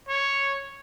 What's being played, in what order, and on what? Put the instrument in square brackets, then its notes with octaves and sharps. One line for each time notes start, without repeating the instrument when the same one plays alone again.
[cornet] C#5